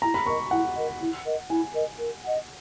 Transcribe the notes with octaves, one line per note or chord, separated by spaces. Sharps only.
E4 A#5
B5
A#4 D#5 C#6
E4 F#5
A#4 D#5
E4
A#4 D#5
E4 G#5
A#4 D#5
A#4
D#5 F#5